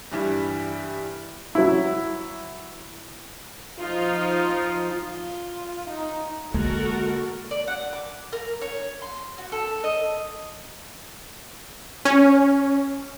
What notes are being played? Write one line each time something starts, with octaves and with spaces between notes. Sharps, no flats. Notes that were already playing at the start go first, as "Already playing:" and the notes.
G2 E3 G3
F#3 E4
F3 D#4 F4
F4
D#4
D3 G#3 A#3 F#4 A4 A#4
D5
F#5
D6
A#4
C#5
C6
F#4
A4
D#5
C#4